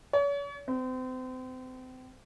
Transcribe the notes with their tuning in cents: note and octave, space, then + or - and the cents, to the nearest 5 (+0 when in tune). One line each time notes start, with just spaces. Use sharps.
C#5 +40
C4 -35